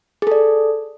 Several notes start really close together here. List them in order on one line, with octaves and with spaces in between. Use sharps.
G#4 A4 D5